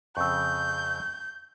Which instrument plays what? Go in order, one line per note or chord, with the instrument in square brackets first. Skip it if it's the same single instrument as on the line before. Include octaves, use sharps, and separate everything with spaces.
[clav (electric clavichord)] F2 C#3 [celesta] C#6 E6 [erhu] G6